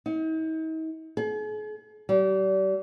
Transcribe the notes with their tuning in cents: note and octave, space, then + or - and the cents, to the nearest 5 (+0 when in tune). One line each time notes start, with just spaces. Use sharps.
D#4 +45
G#4 +45
G3 -35